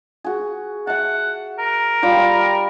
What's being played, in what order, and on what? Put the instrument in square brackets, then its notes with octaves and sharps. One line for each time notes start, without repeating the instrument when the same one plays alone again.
[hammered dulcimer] F#4 G#4
[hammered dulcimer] E5 A5 [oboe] F#5
[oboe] A#4
[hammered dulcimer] G3 F4 G4